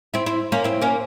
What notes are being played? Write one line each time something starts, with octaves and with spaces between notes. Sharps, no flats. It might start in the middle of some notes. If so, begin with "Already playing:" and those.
C4 E4
C4 E4
A#3 C#4
C4 E4
A#3 C#4